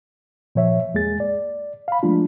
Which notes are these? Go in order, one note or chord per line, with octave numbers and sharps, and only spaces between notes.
A#2 F3 C#5 E5
E2 G#3 A#3 G#4 A6
D5
F5 B5
F3 G#3 A3 D4 F4